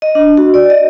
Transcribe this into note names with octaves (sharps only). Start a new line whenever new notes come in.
D#5
D4
F#4
D5
D#5